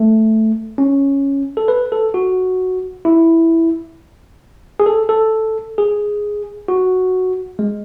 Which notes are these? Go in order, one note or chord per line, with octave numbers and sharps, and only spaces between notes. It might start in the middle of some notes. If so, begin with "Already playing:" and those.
Already playing: A3
C#4
A4
B4
A4
F#4
E4
G#4
A4
A4
G#4
F#4
G#3